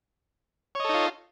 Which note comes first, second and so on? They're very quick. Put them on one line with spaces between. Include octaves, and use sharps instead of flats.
C#5 D#5 A4 D#4 F4